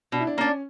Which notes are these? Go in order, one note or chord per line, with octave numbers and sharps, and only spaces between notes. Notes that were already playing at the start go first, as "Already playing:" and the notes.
B2 D4
E4
D4
A#3 C#4 D4